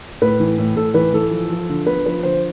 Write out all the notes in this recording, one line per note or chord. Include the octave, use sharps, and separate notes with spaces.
A2 B4
E3
A2
A2 A4
E3 B4
E3 A4
F3
F3
D3
B3 B4
F3 B4
D3 C5